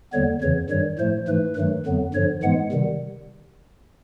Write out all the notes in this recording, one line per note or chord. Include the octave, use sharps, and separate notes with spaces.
D#2 D3 G3 B3 C#5
F2 C#3 E3 C#5
G2 D#3 G3 C#5
A2 F3 A3 C5
G#2 E3 A3 B4
G2 D#3 F#3 A3
F2 D3 F#3 B3
G2 D3 F3 C#5
G#2 E3 G#3 B3 F#5
C3 D#3 G3